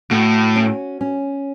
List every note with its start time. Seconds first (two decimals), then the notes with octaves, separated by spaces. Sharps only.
0.11 A2 F#4
0.56 C#4
1.01 C#4